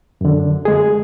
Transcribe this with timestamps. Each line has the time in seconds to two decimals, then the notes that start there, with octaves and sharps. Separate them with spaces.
0.21 F#2 D3
0.65 G#3 G#4